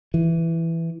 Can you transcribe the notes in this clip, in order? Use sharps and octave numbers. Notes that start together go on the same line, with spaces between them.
E3